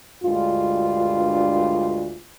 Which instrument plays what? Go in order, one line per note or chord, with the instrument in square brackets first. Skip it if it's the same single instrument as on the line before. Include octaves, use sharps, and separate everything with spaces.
[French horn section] D2 G2 G#3 F4